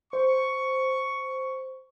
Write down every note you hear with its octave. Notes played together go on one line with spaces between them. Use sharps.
C5 C#6